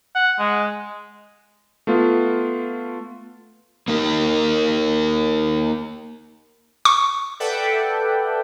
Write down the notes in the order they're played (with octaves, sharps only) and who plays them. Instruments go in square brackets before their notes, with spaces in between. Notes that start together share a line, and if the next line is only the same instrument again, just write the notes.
[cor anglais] F#5
G#3
[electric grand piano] A3 B3 F4
[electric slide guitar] A#3 D#4 A#4
[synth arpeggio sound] C#6
[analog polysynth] A4 B4 D5 E5 F#5 G5